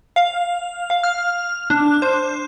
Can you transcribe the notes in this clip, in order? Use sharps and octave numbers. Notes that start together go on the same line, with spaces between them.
F5
F5
F6
D4
C5